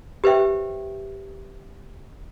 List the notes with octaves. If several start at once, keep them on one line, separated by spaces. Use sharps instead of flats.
G4 B4 C5 E5 G5